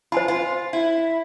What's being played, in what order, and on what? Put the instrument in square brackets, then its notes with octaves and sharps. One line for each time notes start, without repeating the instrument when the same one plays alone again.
[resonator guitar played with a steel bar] F4 [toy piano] C5 G#5 B5
[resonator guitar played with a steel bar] F4
E4